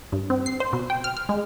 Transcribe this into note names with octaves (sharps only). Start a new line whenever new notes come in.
G2
C4
C7
C5
B2
G5
F6
F6
G#3